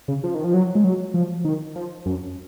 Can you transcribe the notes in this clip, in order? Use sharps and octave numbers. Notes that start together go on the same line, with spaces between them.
C#3
F3
D#3
F3
F#3
G#3
F#3
F3
D#3
F3
F#2